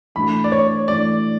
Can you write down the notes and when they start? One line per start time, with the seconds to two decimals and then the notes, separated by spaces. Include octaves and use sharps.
0.15 E3 A3 D4 F#4 B5
0.44 D5
0.52 C#5
0.87 E3 A3 D4 F#4 D5